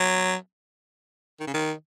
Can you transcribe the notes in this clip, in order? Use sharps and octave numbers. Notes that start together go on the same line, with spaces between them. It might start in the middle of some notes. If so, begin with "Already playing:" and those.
Already playing: F#3
D#3
C#3
D#3